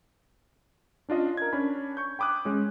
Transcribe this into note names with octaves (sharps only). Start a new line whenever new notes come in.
C#4 D4 F4 D#5
A#4 G#6
C#4 D4 B5
C#6 G6
G5 B5 D6 D#6 F#6
G#3 C#4